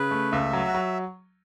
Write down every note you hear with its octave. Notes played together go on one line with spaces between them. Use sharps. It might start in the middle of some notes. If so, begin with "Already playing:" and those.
Already playing: C#3 B4
A3
C#2 E5
F#3
F#4
F#3